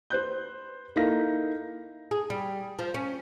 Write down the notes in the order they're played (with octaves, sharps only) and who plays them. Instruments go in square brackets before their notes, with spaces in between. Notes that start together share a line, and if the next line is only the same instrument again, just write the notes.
[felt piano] B4 C5 F#6 G6
A#3 D#4 E4 A4 F5 A#6
[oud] G#4
G3
F3
C#4